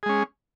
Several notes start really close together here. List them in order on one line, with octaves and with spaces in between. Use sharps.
G#4 G#3 C#4